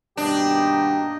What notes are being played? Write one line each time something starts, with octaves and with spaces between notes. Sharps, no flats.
G2 B2 D#3 A#3 D4 D#4 G4 D#5